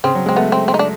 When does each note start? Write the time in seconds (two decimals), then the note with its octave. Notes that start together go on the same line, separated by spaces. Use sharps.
0.04 C#3 C4
0.15 F#3
0.26 G#3
0.29 C4
0.36 A3 B3
0.52 C4
0.68 C4
0.74 D#4
0.79 D4